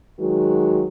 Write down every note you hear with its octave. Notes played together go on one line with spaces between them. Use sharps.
D#3 F#3 G#3 F#4